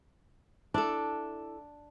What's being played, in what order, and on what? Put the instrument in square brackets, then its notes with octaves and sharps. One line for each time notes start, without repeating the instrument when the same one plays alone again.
[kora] D4 [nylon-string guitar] E4 A4